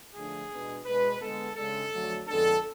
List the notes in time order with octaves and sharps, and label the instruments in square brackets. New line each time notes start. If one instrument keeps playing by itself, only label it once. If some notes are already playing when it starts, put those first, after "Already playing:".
[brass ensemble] D3 F3 A3 D4 G#4
B2 G#3 B3 D4
B2 G#3 D4 B4
D3 G#3 B3 A4
C#3 G#3 D4 A4
F2 D3 F#3 A3 D4
F2 D3 G#3 B3 D4 A4